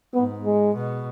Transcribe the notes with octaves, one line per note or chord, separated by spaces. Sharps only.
G#2 B3
G#3
B2